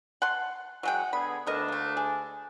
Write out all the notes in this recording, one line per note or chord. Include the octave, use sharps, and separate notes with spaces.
F#5 A5 C6
F#3 G#3 F#5 G5
D3 B3 G#4 B5
D2 B3 D4 A#4 D#5
A3 A#3
G#4